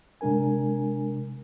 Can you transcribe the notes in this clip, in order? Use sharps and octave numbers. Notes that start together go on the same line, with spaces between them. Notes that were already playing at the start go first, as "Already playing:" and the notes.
C3 G#3 D4 A#4 G#5